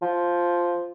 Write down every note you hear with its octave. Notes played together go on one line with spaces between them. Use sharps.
F3